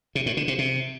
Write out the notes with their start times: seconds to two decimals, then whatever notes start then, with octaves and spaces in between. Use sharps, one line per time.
0.15 C3
0.26 A2
0.37 D3
0.48 C3
0.58 C3